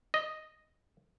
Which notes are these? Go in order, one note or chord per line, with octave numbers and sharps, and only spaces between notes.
D#5